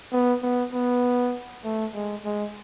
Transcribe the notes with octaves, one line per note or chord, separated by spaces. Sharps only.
B3
B3
B3
A3
G#3
G#3